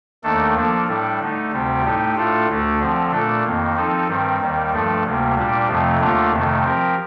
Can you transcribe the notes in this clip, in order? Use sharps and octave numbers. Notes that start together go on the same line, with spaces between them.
D#2 D#3 A3 D4 A4
F3 A#3 D4 A4
A2 G3 D4 A4
D3 A3 D#4
D2 C3 G3 C4 G4
A2 A3 D#4 G4
A2 A3 D4 F4 A4
D2 D3 A3 D4
D3 F3 C4
A#2 A3 D4 A4
F2 D#3 A#3
F3 C4 D#4 A4
G2 D#3 G3 C4
D#2 D#3 G3
G2 F3 A3 D4 A4
D2 C3 G3 A#3
A#2 G3 D4 G4
F2 C3 F3 A3 C4
D#2 D3 A3 D4 F4
F2 C3 D#3 A3
F3 C4 G4 A#4